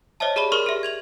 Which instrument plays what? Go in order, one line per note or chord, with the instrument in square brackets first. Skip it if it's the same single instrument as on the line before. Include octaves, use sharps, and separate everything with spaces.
[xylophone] C5 C#5 D#5 E5 A5
G4 G#4 D5 B5 G7
G#4 A#4 C6 C#6 F6
G4 E5
G#6 F7 F#7